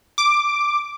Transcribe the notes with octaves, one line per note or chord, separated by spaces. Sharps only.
D6